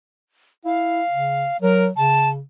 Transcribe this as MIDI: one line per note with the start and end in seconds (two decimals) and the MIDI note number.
0.65 1.02 64
0.65 1.57 77
1.11 1.46 49
1.62 1.89 54
1.62 1.85 70
1.97 2.40 49
1.97 2.29 81